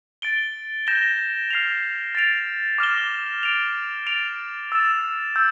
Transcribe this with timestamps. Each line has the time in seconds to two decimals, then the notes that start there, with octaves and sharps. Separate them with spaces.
0.22 A6 D7 G7
0.87 G6 A#6 E7 G7
1.51 F6 C7 F7
2.15 A6 D7 F7
2.78 D6 F6 A#6 E7 G7
3.43 A6 D7 F7
4.07 A6 D7 F7
4.72 E6 A6 E7
5.36 E6 G6